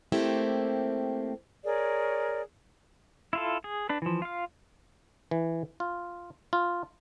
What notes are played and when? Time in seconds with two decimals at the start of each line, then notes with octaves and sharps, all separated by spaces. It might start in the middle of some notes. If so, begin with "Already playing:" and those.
0.12 A3 A#3 C4 E4 G4
1.64 G#4 A#4 C#5 D5
3.33 E4 F4 A4
3.64 G#4
3.89 D4 B4
4.02 E3 F3
4.22 F4 F5
5.31 E3
5.80 F4
6.53 F4